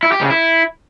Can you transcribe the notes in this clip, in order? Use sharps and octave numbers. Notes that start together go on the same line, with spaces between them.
E4
G4
C#3
E4